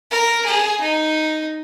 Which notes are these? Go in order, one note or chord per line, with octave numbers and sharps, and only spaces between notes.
A#4
G#4
D#4